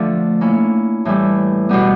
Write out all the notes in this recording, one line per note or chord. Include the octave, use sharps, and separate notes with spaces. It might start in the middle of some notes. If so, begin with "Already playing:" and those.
Already playing: D3 F3 A3
A#3 C#4 E4
A2 E3 G3
B2 G3 B3